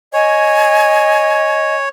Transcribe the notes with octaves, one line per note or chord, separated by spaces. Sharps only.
C#5 D#5 G#5